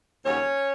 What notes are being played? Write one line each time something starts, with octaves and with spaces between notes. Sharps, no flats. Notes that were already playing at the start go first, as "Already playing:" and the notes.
D#2 C#3 F#3 C#4 C#5